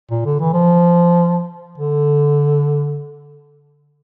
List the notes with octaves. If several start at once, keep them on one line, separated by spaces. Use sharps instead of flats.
A#2
D3
E3
F3
D3